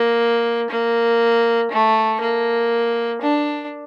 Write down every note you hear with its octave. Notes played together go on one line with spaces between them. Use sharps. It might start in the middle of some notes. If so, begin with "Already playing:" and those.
Already playing: A#3
A#3
A3
A#3
D4